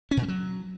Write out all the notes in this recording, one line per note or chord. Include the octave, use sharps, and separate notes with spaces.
C#4
A#2
G3
F#3